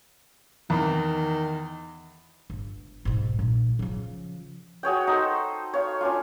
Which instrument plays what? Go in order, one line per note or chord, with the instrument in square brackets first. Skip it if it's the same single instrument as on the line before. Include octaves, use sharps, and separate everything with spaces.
[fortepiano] E2 [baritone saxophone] D#3
[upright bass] G1
G#2 B2
A#1
C#3 F3
[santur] F#4 G#4 C#5 G5
D#4 A4 C5
C#5 F5
C#4 D4 F4